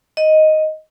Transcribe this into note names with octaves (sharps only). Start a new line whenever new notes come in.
D#5